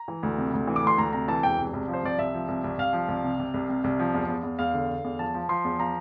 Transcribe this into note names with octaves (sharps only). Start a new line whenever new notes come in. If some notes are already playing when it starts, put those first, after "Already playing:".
Already playing: A#5
E3
D2
C3
D2
E3
D6
D2 C6
D2 A#5
C3 A#5
E3 A5
E1 G5
C2
C2
F3
C5
C2 D5
C2 E5
F3
C2
C2
C2 F5
F3
C2
C3
C3
C2
C3
C2
F3
E2
E2
E2
E2 F5
D3
D3
E2
F3 A5
F3
F3 C6
E2
F3 A#5